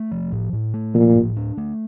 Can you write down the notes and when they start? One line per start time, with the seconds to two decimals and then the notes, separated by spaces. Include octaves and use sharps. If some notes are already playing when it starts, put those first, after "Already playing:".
Already playing: A3
0.11 F3
0.32 A2
0.53 A2
0.74 A3
0.94 A#2 F3
1.15 A2
1.37 D4
1.57 A3